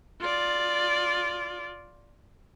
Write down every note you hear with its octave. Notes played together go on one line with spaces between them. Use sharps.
F4 D5